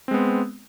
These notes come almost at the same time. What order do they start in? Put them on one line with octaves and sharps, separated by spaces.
C4 G#3 B3